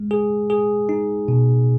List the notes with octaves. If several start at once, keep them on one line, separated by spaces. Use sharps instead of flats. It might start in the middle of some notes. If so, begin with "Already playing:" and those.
Already playing: G#3
G#4
G#4
D#4
B2